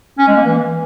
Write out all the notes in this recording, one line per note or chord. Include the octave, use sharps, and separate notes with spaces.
C#4
G#3
A#3
E3